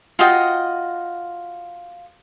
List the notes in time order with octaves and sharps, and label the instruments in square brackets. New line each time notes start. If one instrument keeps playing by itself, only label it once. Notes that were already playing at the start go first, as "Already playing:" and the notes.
[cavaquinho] F4 F#4 D#5 G5